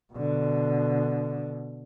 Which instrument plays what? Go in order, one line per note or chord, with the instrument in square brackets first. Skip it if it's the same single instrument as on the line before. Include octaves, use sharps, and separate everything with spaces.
[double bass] B2 D3